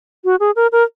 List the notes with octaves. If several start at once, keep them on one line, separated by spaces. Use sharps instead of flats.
F#4
G#4
A#4
A#4